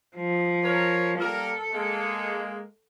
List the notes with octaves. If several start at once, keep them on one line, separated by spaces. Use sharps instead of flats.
F3
A#4 C#5
G3 A#3 A4 A#4
G#3 A#3